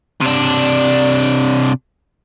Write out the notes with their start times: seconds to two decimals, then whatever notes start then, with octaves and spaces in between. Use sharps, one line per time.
0.21 C3 D4